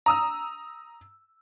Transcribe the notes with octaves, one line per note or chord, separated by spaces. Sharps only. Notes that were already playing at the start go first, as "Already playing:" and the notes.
A#5 D#6 E6